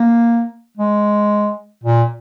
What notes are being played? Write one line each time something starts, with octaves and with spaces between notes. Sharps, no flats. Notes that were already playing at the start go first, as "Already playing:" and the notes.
Already playing: A#3
G#3
A#2